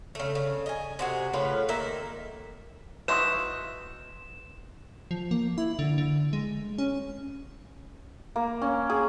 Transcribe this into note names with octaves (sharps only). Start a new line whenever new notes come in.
C#3 A3
C#3
D#5 G#5
C3 F#4 G#4
A2 C#3 F4 B4
D#3 A#3 E5
D#4 E4 F#4 B4 C6 D#6 E7
F3
A#3
E4
D3
D3
G#3
C#4
A#3
C#4
G#4